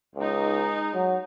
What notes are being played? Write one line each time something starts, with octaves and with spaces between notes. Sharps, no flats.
C#2 G#3 D#4
F#3